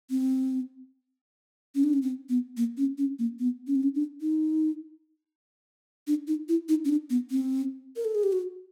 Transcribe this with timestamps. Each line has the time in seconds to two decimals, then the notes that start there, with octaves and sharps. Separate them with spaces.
0.10 C4
1.75 C#4
1.84 D4
1.93 C#4
2.02 C4
2.29 B3
2.57 A#3
2.77 C#4
2.98 C#4
3.19 A#3
3.39 B3
3.67 C#4
3.75 C4
3.83 C#4
3.95 D4
4.22 D#4
6.07 D4
6.28 D#4
6.49 E4
6.69 D#4
6.85 C#4
6.89 D4
7.10 B3
7.31 C4
7.96 A#4
8.05 A4
8.15 G#4
8.23 G4
8.33 F#4